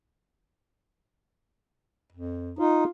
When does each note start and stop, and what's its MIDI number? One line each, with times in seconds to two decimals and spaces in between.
2.12 2.52 41
2.59 2.84 63
2.59 2.88 65